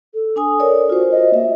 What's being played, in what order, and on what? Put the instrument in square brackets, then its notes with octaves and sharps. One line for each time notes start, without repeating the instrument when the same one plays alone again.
[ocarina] A4
[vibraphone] D4 G#5 D#6
A#4 C#5 D5
[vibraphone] F4 C5 [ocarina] F#4
[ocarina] D#5
[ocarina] A#3 [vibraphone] E5